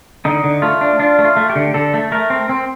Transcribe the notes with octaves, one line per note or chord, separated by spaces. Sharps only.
D3 D#4
D3
A3 F4
D4
D4 F4
A3
F4
A3
G4
D3
D3 A4
A3
A3 A#4
C4
C4